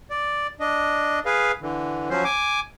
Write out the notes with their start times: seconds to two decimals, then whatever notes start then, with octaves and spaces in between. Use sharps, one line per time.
0.10 D5
0.60 D4 D#5
1.26 G#4 B4 F5
1.62 D3 E3
2.10 F3 F#3 C#4 C5
2.25 G#5 D6